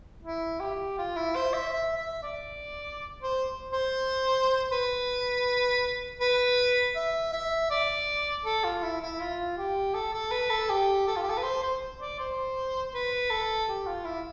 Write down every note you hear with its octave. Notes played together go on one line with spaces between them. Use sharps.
E4
G4
F4
E4
C5
E5
E5
E5
D5
C5
C5
B4
B4
E5
E5
D5
A4
F4
E4
E4
F4
G4
A4
A4
B4
A4
G4
A4
F4
G4
A4
B4
C5
C5
D5
C5
B4
A4
G4
F4
E4